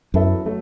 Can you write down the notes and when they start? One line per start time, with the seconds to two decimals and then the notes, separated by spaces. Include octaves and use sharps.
0.14 F#2 F#3 B3 E4 A4 E5
0.46 F#3 A3